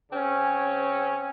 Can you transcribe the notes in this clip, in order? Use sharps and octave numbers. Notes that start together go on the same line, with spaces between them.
C#3 C4 C#4